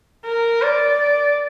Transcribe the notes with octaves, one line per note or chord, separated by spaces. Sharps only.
A#4
D5